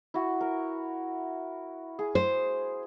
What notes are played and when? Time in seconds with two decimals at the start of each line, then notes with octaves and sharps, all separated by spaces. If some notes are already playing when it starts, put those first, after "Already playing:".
0.14 E4 F#4
0.41 A#4
1.99 G#4
2.15 C5